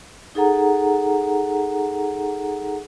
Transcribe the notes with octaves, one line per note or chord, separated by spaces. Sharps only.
D#4 G#4 A4 F#5 A#5